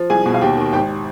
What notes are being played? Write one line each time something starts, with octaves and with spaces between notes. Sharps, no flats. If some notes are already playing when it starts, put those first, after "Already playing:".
Already playing: F3
C2 G#4 G#5
B2
F5
D#2 G4 G5
D#3
G#1 G4 G5